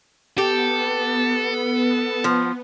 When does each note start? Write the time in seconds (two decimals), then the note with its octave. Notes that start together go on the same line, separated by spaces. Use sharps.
0.38 B3 G4 A4
2.24 F3